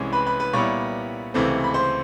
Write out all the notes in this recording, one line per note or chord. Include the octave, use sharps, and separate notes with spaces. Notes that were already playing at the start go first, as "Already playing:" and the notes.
Already playing: C2 C3 E3 G#3 C#4
B4 B5
B4 B5
B4 B5
A#2 G3 B3 E4 C#5 C#6
C#2 C3 E3 A3 C4
B5
C5 C6